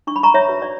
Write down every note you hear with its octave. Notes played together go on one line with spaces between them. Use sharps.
D4 C#6
B5
A#5 C#6
C#5 E5
F#4 B4
D5